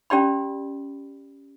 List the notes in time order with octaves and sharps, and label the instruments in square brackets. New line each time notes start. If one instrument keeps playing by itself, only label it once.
[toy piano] C#4 G4 D5 B5